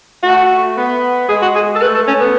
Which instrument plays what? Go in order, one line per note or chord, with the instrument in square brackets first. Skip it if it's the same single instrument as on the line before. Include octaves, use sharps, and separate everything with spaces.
[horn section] A3 [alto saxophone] F#4
[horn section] B3
[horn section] G#3 [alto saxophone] G#4
[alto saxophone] F#4
G#4
A4
[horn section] A3 [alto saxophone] B4
[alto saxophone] A4
C#4
B3